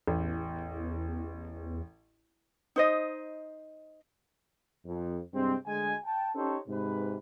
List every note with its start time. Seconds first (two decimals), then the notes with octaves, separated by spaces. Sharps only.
0.07 A1 E2
2.76 D#4 C5 D#5
4.86 F2
5.34 G2 C3 G#3 C4
5.67 D2 G#3 G#5
6.05 G5 A5
6.35 C#4 D#4 G4 A4 C5 C#5
6.69 G#2 C3 B4